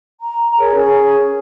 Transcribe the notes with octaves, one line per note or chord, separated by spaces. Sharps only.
A#5
G#4 A#4 C#5
C#4 G#4